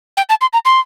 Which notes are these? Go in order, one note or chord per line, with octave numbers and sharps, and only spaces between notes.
G5
A5
C6
A#5
C6